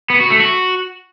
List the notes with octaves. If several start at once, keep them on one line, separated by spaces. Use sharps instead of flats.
B3
F#4
A3
F#4